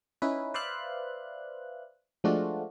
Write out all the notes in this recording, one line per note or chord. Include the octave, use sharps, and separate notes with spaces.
C#4 D#4 E4 B4
B4 C5 D5 E5 F5 F#6
F3 G#3 A3 D4 F4 F#4